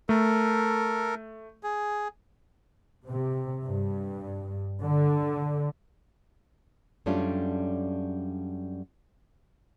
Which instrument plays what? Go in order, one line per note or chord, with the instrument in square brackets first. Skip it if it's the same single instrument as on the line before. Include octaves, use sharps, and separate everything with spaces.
[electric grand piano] A3 [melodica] A4 A#4
[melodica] G#4
[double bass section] C3
G2
D3
[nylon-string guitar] F#2 G3 A3 C#4 D4 F4